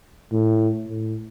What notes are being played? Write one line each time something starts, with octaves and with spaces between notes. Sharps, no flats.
A2
A2